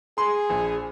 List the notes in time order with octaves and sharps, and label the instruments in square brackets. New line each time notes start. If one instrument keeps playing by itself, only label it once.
[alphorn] G#4 [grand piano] C6
[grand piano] A#1